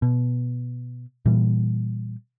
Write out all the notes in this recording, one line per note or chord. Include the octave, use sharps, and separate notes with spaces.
B2
A#2 E3 G3